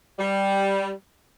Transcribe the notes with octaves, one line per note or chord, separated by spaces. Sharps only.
G3